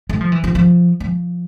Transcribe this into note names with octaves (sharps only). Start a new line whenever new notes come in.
A3
F3
E3
F3
F3
F3